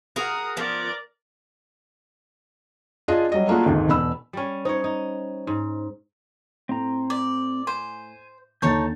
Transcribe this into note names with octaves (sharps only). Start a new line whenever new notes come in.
F#4 G#4 A#4 D#6
F3 B3 A#4 D5
D4 F4 G#4 D#5
F#3 G3 D#5
A3 A#3 D4 F4 F#4 G#4
G#1 D2 G#2
E1 B2 B5 E6
G3 C#4
D#4 C5 C#5
D#4
G#2
A2 C4 A#5
D5
C5 G#5
D#2 D3 D#4 C#5 A5 G6 A6